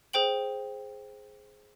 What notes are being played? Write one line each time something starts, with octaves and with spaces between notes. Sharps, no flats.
G#4 C5 G5 F#7